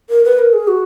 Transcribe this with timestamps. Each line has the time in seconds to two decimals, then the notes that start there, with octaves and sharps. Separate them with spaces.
0.10 A#4
0.24 B4
0.39 A#4
0.53 G#4
0.68 F#4